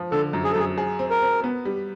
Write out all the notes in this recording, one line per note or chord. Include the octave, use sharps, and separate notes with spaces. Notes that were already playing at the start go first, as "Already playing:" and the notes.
Already playing: F3
D3 A4
F#2
G#4
A4
F#2 G#4
G#4
C4
A#4
C4
B3
G3